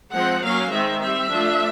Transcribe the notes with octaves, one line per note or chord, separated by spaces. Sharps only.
F3 G#3 C4 F#5
F#3 A#3 C#4 F5
D#3 G#3 C4 E5
G3 C4 E5
F3 A3 D4